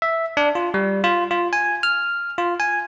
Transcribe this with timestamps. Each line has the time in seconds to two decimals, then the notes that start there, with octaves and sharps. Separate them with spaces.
0.02 E5
0.37 D4
0.55 F4
0.74 G3
1.04 F4
1.31 F4
1.53 G#5
1.83 F6
2.38 F4
2.60 G#5